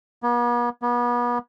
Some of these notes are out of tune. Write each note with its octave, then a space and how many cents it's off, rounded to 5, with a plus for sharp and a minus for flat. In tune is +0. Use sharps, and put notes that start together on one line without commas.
B3 -45
B3 -35